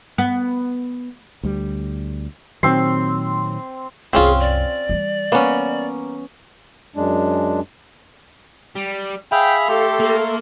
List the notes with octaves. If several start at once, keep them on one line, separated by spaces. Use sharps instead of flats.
B3
D2 G3
A#2 D#3 F#3 C4 C6
C2 F#2 C4 C#4 F4 G#4
D5
E3 G3
A#3 B3 C#4
F#2 G#3 D4
G3
G#4 E5 F5 G5 B5
A3 G4 A4 C6
A#3